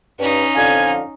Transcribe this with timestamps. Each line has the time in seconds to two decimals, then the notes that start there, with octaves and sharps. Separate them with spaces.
0.19 G2 C#4 D#4
0.55 F2 D3 F5 G#5